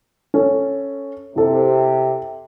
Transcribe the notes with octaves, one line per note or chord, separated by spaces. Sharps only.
C#4 A4
C3 E4 A4